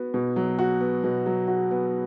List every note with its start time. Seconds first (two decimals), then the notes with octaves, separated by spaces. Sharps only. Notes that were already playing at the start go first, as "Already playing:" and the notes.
Already playing: B3 F#4
0.14 B2
0.36 F#3
0.59 F#4
0.81 B3
1.04 B2
1.26 F#3
1.48 F#4
1.71 B3